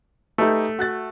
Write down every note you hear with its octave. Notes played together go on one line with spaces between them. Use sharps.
A3 D#4 G4 B4
F#4 F#6 A6